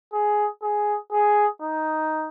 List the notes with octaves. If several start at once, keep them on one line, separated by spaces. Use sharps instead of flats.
G#4
G#4
G#4
D#4